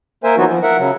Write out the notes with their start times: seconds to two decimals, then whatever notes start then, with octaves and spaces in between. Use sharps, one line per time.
0.24 A#3 A#4 C5 E5 G#5
0.37 E3 F#3 B3 D#4 F4 F#4
0.49 F3
0.63 A#4 E5 F#5
0.78 C#3 F#3